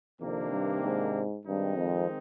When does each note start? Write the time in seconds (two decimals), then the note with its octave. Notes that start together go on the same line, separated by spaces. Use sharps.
0.20 F2 C3 D#3 A#3 D4
0.51 G2
0.83 G#2
1.46 G2 D#3 G#3 C4 D#4
1.77 F2